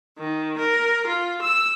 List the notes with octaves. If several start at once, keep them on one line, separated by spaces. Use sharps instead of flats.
D#3
A#4
F4
E6